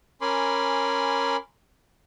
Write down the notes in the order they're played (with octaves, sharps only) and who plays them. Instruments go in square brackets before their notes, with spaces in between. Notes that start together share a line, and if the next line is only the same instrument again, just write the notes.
[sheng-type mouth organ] C#4 A#4 G#5 B5 C6 D6